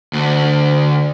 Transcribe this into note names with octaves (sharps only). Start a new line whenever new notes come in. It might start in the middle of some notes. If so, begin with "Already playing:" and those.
D2